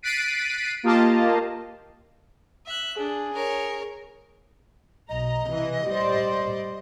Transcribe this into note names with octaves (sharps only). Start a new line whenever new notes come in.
F#6 A6 B6 C7 D7 D#7
A#3 F4 G4 D#5 F5 A5
E5 F#6
D4 G#4
A#4 C#5
B1 D#5 A#5
C3 E3
G3 C5 D5